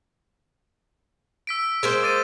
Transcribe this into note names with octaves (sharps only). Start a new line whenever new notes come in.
E6 B6 D7
G#3 A#3 C5
D6 A6 D#7